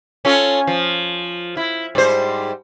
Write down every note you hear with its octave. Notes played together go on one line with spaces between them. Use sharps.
C#4 F4 A4
F3
E4
G#2 G3 C5